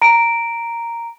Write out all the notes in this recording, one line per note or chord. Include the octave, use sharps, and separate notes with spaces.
A#5 D7